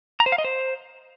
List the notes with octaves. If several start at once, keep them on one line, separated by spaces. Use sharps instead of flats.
A#5
C5
F5
D#5
C5